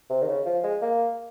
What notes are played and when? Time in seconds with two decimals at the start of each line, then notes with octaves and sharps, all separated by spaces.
0.10 C3
0.22 D#3
0.28 C#3
0.46 F3
0.64 G#3
0.82 A#3